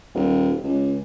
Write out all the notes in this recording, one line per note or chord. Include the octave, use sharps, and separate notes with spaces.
D#1
C#2